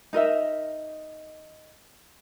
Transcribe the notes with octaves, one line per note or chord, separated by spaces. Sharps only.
D#4 A#4 D#5 E5